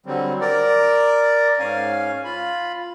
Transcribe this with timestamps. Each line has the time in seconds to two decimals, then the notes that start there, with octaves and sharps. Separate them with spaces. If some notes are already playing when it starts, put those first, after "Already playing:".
0.06 D3 F#3 G3 C4
0.41 A#4 D5
1.59 G#2 C#4 F5 G#5
2.25 F4 B5